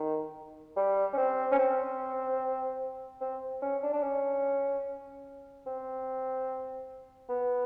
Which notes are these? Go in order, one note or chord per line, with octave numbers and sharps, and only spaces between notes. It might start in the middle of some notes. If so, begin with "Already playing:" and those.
Already playing: D#3
G3
C#4
C4
C#4
C4
C4
C#4
D4
D4
C#4
C4
B3